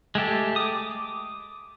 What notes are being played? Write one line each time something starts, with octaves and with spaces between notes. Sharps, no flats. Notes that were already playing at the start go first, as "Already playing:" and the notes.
G#3 A3 G4 A4
D6 D#6